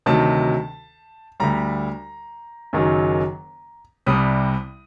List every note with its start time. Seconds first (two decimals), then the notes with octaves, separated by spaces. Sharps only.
0.06 D2 C3 D#3 F#3 A5
1.40 D2 D3 G3 A#5
2.73 F#1 F#2 D#3 F#3
4.06 C2 C3 G3 D#6